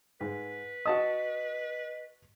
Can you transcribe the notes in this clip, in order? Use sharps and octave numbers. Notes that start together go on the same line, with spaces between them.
G#2 B4
F#4 D#5 A5 D#6